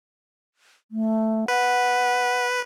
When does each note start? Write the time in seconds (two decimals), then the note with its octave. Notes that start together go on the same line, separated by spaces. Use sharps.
0.91 A3
1.48 B4 F#5